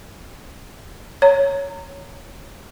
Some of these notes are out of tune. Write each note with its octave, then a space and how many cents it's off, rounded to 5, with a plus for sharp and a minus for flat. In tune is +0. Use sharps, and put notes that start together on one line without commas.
C#5 +0 A#5 -25